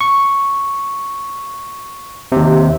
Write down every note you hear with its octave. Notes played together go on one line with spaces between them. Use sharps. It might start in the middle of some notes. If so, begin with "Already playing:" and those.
C#6
D#2 C3